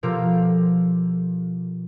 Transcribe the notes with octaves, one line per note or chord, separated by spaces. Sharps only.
B2 F3 F4 G4 A4 A#4